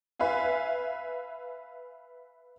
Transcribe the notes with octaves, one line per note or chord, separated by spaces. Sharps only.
B4 E5 F5 G#5